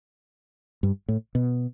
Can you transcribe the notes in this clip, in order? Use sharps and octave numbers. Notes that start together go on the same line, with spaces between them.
G2
A2
B2